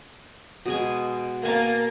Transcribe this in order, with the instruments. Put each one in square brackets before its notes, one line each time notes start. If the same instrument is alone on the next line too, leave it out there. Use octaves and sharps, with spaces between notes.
[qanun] B2 G#3 G#5
[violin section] A#3 [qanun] G#5 A5